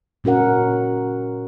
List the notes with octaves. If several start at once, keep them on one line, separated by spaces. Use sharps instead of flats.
A#2 C#4 F#4 A#4 F#5